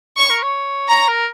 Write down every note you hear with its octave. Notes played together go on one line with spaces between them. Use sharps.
C#5 C#6
A#4
C#5
C#5 A#5
A#4